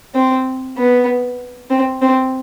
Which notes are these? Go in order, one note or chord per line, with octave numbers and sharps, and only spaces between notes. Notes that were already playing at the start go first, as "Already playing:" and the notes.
C4
B3
C4
C4